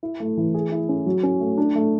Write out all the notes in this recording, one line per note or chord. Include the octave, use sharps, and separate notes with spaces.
E4
A3
E3
G#4
E4
C#4
F#3
C#4
A3
D4
A3